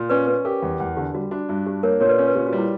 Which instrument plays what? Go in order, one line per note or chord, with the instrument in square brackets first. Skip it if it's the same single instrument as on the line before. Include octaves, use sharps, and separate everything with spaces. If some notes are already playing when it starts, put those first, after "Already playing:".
Already playing: [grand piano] A#2
[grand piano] C#4 [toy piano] B4 D5
[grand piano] C#4 [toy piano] B4
[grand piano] G4 [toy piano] A#4
[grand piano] E2
E2
[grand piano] D3 [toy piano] G4
[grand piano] G3 [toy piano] F#4
[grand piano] D4 [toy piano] F#4
[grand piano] G2 [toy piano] F#4
[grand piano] D4 [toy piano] G4
[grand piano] A#3 [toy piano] A#4 C#5
[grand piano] A#2 [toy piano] A#4 C#5
[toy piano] B4 D5
[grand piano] C#4 [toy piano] A#4 C#5
[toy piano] B4
[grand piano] A#2 [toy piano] G4
[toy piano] F#4
[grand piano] G3
[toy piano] E4